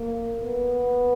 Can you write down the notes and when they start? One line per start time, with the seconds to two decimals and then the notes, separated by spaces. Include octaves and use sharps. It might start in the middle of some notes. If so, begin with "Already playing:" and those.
Already playing: A#3
0.42 B3